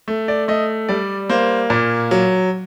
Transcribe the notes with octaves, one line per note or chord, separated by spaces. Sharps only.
A3
D5
A3 D#5
G3 D5
A#3 C5
A#2
F#3